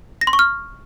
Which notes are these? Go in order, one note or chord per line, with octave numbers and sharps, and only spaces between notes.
A#6
C6
C#6
F6